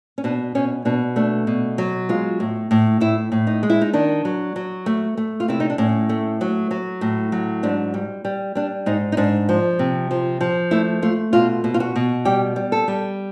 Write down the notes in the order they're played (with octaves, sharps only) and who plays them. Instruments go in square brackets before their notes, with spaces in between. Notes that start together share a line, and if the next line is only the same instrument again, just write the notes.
[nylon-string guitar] C#4
B2 D4
B2 C#4
B2 D4
A3 D4
B2
F#3
G#3 F4
A2
A2
A2 E4
A2
D#4
G#3
E4
D#4
D#3 D4
F#3
F#3
A3
A3
F4
C3 E4
D#4
D4
A2 C#4
A3
F#3
F#3
A2
F#3
G#2 D4
G3
G3
G3 D4
G#2 D#4
D#4
G#2 D4
F3
C3
F3
F3
A3 E4
A3 F4
B2 F4
B2
F4
F#4
B2
G3 G4
G3
A4
G3